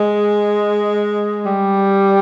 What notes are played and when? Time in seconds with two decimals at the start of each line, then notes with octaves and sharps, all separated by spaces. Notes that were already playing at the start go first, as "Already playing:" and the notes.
Already playing: G#3
1.46 G3